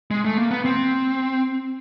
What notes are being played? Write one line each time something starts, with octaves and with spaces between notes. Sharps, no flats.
G#3
A3
A#3
B3
C4